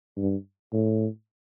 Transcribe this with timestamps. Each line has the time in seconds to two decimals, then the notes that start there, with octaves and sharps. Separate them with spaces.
0.17 G2
0.73 A2